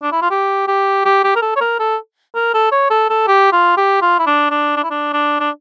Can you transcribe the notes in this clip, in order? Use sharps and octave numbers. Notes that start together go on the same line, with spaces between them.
D4
E4
F4
G4
G4
G4
G4
A#4
A4
C#5
A#4
A4
A#4
A4
C#5
A4
A4
G4
F4
G4
F4
E4
D4
D4
D4
E4
D4
D4
D4